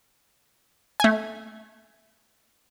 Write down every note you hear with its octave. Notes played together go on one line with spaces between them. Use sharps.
A3 G#5